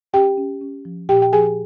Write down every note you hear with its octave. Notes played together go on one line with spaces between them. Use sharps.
C#4 G4 G5
C#4
C#4
F3
A#2 G4 G5
G5
F3 G#4 G#5